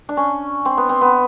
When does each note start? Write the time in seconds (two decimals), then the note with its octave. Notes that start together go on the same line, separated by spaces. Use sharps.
0.09 D4
0.17 C#4
0.65 C4
0.77 B3
0.89 C4
1.01 B3